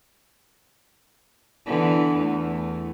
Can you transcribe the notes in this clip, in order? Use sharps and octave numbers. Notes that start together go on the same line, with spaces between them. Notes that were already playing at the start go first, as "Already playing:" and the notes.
D3 E3 B3
E2 A3